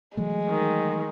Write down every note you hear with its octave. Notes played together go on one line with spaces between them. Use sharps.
E3 F#3 G#3 A3
D#3